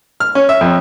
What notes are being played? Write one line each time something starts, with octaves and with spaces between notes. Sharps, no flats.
F6
C#4
E5
F2